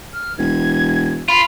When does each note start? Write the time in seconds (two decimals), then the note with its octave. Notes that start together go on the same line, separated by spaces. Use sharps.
0.13 F6
0.38 E1 G#6
1.29 F4 B5